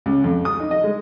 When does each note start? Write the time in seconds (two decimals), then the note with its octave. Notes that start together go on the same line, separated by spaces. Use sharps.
0.06 C#2
0.24 F2
0.45 D#6
0.60 D#4
0.71 D#5
0.84 G#3